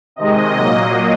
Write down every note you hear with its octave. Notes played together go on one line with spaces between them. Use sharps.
C3 D#3 G#3 D#5
A#2 F#3 A#3